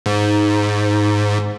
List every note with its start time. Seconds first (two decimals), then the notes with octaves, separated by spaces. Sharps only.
0.06 G#2